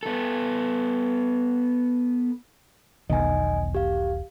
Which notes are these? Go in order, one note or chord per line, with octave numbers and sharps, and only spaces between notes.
B3 A4
E1 B1 D#3 D#5 G#5
G4 F5